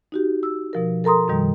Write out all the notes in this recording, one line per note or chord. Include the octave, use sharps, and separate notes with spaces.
D#4 F#4 G4
E6
B2 F3 A#4
A4 A#4 A#5 C6 D#6
F#2 B2 D#3 G3